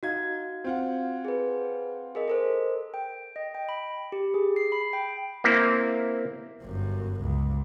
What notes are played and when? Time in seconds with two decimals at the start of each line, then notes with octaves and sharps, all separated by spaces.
0.03 D#4 F#4 F5 G#6
0.64 C4 F4 F#5
1.25 G#4 B4
2.15 G#4 A#4 D#5
2.28 A4 A#4 C5
2.94 G5
3.36 D#5
3.55 G5
3.69 B5
4.12 G4
4.34 G#4
4.56 C7
4.72 B5
4.93 G5
5.44 A#3 C4 E4
6.64 G1 F#2
7.21 C#2